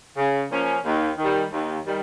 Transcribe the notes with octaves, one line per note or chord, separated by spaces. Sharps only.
C#3
F3 A#3 C#4
D#2
D#3 G3
D#2
D#3 G3